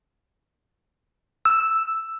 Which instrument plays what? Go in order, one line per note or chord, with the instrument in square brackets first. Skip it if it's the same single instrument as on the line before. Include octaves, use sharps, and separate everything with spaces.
[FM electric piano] E6